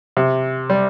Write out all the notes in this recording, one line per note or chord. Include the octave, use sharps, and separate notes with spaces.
C3
G3